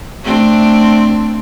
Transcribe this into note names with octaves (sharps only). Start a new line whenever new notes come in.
A3 C4 D4